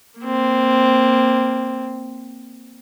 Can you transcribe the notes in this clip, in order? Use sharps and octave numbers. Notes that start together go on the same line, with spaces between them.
A#3 C4